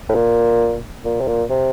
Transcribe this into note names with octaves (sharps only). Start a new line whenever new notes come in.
A2
A#2
A#2
C3
A#2
C3